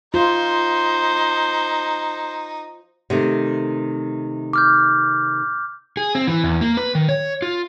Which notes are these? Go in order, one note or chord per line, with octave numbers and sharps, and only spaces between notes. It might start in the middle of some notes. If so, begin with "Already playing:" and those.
D#4 F4 C5
C3 D#3 A3
D6 F6 G6
G#4
C4
E3
E2
A#3
B4
D#3
C#5
F4